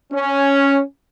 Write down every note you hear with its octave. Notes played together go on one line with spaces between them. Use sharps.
C#4